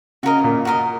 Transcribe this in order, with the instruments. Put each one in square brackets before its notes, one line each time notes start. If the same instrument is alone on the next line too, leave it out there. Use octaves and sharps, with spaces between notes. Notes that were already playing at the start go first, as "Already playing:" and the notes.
[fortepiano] C#3 [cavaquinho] F#4 A#4 D#5
[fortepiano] A#2
[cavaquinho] F#4 A#4 D#5